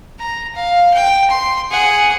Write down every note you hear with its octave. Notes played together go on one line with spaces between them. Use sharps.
A#5
F5
G5
C6
G#4 F#5